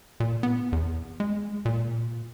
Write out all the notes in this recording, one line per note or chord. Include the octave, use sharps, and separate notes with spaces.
A#2
B3
E2
G#3
A#2